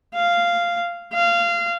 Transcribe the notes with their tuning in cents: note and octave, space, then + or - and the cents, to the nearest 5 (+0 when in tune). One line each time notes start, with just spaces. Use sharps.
F5 -10
F5 -20